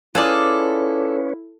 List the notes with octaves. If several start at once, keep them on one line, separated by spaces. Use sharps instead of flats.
C#4 E4 F4 G#4 A4 B4 C#5 D5